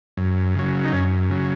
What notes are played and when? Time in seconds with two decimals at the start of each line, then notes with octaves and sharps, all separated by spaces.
0.17 F#2
0.55 C#3 F#3
0.85 D#4
0.93 F#2 C#4
1.30 C#3 F#3